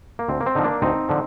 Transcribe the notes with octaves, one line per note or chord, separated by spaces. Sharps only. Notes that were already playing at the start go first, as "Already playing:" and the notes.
A#3
D2 C4
A#3
C4
D3 F3 D#4
A#3 D4
D2 C4 D#4
D3 F3